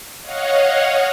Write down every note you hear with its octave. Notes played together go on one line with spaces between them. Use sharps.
C#5 D#5 F5 F#5